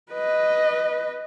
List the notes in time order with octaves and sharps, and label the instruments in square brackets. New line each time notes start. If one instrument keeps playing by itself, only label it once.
[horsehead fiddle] B4 D#5